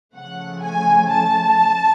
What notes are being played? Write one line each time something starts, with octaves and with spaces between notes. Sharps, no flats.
C#3 F3 A3 F#5
G#5
A5